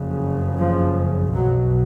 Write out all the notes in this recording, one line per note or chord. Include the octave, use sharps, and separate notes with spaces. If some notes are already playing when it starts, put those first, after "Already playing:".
Already playing: F#1 F2 C#3
F3
B1 B2 F#3